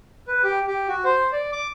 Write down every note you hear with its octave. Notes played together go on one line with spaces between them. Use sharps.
B4
G4
G4
F#4
C5
D5
D6